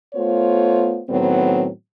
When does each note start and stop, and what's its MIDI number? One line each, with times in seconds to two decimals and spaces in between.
0.15 1.01 57
0.15 1.01 59
0.15 1.01 65
0.15 1.01 72
0.15 1.01 73
1.09 1.68 45
1.09 1.68 51
1.09 1.68 54
1.09 1.68 59
1.09 1.68 60